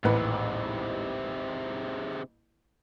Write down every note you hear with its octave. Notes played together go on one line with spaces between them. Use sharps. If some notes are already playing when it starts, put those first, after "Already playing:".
D#1 A1 G#2 C3 B4